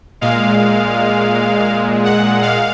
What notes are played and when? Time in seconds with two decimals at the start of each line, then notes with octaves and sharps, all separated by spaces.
0.21 A#2 G#3 F5
2.05 F#5
2.42 F5